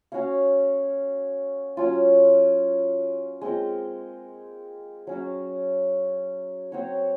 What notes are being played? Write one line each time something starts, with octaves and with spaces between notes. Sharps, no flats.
C#4 F#4 C#5 F5
F#3 C#4 F4
G#3 C4 F4 A#4
F#3 C#4 F#4
F#3 C4 F#4 C#5